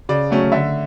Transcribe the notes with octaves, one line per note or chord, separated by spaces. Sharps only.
C#3 D5
F#3 A3 C#4
D3 E5